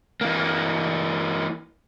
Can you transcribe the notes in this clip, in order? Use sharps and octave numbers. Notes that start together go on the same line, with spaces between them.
E3 A#3